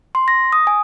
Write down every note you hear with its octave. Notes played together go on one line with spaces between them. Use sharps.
C6
A#6
D#6
G#5